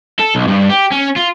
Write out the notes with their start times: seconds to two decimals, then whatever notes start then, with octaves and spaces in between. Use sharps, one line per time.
0.19 A4
0.35 B1
0.48 G2
0.70 G4
0.92 C#4
1.16 F4